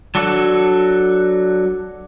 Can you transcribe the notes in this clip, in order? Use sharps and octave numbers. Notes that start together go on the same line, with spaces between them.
F#3 D4 F#4 A4